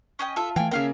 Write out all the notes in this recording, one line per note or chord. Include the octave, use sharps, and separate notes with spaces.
C#4 D#5 G5
F4 A4 E5
E3 A3 F5 G5 G#5
C#3 A#3 C4 C#4 E5 F5 G5